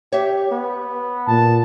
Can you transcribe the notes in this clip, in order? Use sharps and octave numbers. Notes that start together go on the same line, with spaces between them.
G4 C#5 E5
B3
A#2 A5